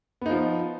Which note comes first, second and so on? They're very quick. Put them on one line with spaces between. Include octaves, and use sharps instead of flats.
B3 D#4 F3